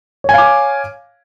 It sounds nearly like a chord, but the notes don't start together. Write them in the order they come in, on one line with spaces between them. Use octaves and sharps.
C#5 G#5 F5 D6